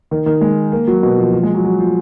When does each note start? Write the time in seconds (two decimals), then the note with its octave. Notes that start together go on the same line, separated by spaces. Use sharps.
0.11 D#3
0.26 D#3
0.41 G#3
0.72 A#3
0.87 F#3
1.03 B2
1.18 F3
1.33 F3
1.43 G#3
1.54 F#3
1.64 F#3
1.79 F3